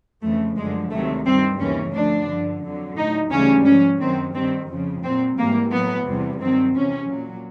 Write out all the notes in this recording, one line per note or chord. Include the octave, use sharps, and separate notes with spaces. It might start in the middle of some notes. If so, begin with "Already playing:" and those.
F2 C#3 E3 A3
F#2 D3 F3 G#3
D2 C3 D#3 F#3 A3
G2 D#3 G3 C4
D#2 C#3 E3 C#4
D2 D3 F3 D4
G2 D3 F3
F2 D3 F#3
A2 F#3 D#4
D2 C#3 E3 G3 C#4
G#2 F3 C#4
F#2 D#3 F#3 C4
G2 D#3 G3 C4
F2 C#3 F3
A#2 F#3 C4
G#2 E3 G3 A#3
A2 F#3 B3
E2 C3 E3 G3
G2 D#3 F#3 C4
E2 C3 F3 C#4
A#2 F#3